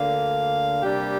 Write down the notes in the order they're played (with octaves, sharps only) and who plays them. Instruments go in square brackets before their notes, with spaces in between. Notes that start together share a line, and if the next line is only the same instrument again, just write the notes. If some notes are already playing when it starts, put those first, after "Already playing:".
Already playing: [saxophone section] D2 D3 A#3 F5
C3 G3 A#3 D4 G4